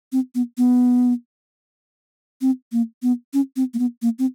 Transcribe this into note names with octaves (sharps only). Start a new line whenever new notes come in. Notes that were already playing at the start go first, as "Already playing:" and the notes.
C4
B3
B3
C4
A#3
B3
C#4
C4
A#3
B3
A#3
C4